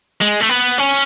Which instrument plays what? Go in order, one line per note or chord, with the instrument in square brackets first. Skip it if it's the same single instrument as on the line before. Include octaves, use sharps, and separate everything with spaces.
[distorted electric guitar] G#3
A3
B3
C#4